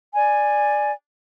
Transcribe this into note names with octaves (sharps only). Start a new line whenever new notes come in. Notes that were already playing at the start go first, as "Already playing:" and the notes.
D5 G#5